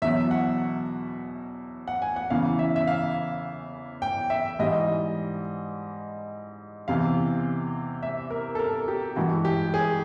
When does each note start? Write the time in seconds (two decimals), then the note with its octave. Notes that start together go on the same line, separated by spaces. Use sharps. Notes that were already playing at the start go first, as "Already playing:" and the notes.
0.02 E2 B2 F#3 E5
0.31 F#5
1.88 F#5
2.02 G#5
2.16 F#5
2.30 E2 C#3 E3 F5
2.59 E5
2.76 E5
2.87 F5
4.02 G5
4.30 E5
4.59 G#2 E3 G3 D#5
6.88 E2 C3 E3 F5
8.03 E5
8.30 A#4
8.55 A4
8.59 A#4
8.88 G4
9.16 G2 E3 G#3 F#4
9.45 G4
9.74 G#4